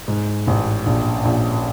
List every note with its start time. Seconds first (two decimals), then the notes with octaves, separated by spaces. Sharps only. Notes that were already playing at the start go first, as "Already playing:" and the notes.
0.08 G#2
0.47 A1
0.86 A#1
1.25 A#1